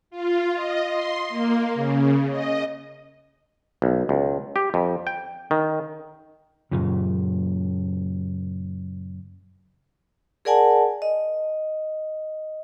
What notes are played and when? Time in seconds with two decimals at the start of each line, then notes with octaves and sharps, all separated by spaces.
0.11 F4
0.55 D#5
0.89 C6
1.29 A#3
1.74 C#3
2.31 D#5
3.82 B1
4.09 C#2
4.56 G4
4.74 F2
5.07 G5
5.51 D#3
6.71 F#2 A#2 C#3
10.45 G#4 A#4 D5 F#5 G#5 A5
11.02 D#5